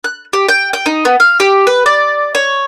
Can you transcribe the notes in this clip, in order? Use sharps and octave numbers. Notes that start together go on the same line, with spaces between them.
F#6
G4
G5
G5
D#4
B3
F5
G4
B4
D5
C#5